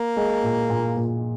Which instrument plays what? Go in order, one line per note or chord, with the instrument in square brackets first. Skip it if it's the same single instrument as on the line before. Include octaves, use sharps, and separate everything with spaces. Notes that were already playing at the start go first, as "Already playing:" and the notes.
Already playing: [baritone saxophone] A#3
[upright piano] G#3
A#2
A#2
A#2